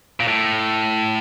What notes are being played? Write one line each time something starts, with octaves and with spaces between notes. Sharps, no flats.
A#2
A2